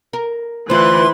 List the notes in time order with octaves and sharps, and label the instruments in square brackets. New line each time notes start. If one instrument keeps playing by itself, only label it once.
[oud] A#4
[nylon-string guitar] D2 F4 [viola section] E3 B4 [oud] C5 [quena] C6